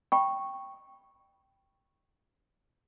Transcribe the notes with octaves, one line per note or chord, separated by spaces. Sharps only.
G5 B5 C#6